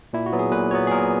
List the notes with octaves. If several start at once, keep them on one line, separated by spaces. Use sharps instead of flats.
A#2 E4
F#4
F#3 B3
G#4
A#2 B4
F#3 B3 C#5
G#4
A#2 A#4